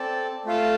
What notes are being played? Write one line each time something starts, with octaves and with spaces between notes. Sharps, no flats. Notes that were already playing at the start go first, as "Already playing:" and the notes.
Already playing: C4 A4 D5 A5
A3 F4 A4 F5 A5